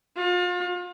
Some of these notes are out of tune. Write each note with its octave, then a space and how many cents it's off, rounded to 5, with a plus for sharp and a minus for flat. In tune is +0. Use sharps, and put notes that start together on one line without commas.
F4 +35